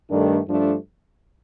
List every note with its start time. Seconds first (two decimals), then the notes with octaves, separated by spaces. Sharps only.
0.09 G2 D#3 A3 D4
0.47 G2 F3 A3 D4 A4